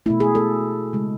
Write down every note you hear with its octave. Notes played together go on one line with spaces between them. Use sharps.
B2 A3 E4
G#4
A4
C#3 G#3